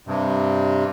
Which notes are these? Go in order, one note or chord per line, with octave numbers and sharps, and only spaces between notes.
G2 C3